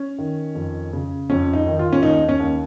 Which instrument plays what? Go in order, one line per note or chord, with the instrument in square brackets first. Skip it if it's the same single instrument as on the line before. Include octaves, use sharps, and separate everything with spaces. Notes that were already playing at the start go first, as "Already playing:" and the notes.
Already playing: [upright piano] C#4
D#3
F2
C#3
F2 C#4
D#4
D#3
F4
C#4
D#2 D#4
C#4
D#2